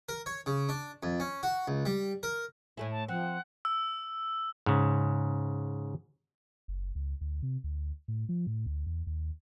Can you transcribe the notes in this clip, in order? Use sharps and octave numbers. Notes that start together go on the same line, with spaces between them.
A#4
C#5
C#3
D4
F2
C#4
F#4
C#2
G3
A#4
A2 A3 E4 G#5
A5
F3 C4 F#5
E6
G#2 C#3
F#1
C#2
D2
C3
D2
A2
F3
A2
D2
E2
D#2